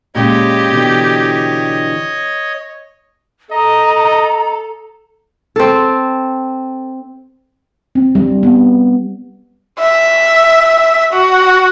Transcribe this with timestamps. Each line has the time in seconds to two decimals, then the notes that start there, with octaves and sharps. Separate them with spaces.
0.15 A#2 C#3 G#3 G4 C#5 D#5
0.71 B2 D3 E3
3.51 A4 D#5 A#5
5.56 C4 A4
7.95 C4
8.15 G3
8.43 B3
9.79 E5
11.12 F#4